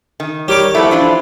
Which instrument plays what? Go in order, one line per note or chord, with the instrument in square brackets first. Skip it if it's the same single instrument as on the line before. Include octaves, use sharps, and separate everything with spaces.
[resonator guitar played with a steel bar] D#3
[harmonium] G3 A#4 C#5 [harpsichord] G4 D6
[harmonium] F3 E4 [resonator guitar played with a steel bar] A3 B3 F#4
[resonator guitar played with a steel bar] E3 D4 F4